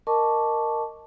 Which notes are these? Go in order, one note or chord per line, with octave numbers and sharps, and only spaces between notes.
A#4 D#5 A5 C#6 D6